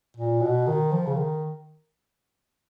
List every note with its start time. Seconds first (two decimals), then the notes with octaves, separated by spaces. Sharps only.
0.17 A#2
0.42 B2
0.67 D#3
0.92 F3
1.07 C#3
1.17 D#3